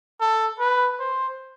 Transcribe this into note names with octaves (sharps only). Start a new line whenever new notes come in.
A4
B4
C5